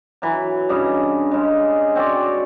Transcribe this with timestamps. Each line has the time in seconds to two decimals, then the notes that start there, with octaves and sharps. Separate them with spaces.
0.22 E3 F#3
0.69 G2 C#3 D#5
1.31 C#3 G#3
1.96 C4 F#4 C#5 D5